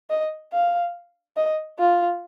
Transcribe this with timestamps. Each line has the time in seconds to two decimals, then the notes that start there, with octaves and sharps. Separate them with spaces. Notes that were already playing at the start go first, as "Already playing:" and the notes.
0.10 D#5
0.53 F5
1.36 D#5
1.79 F4